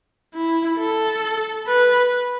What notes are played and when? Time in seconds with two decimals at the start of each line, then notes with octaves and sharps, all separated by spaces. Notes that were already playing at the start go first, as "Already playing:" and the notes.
0.34 E4
0.78 A4
1.67 B4